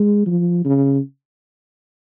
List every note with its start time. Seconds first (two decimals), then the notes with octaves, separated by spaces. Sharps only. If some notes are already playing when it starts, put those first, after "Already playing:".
Already playing: G#3
0.27 F3
0.65 C#3